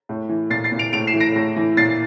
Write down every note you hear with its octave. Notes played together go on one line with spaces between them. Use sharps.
A2
E3
A#2 A6 C7
A6 C7
A#2
D7 F7
A2 D7 F7
C7 E7
E3
A#6 D7
A2
E3
A#2 A6 C7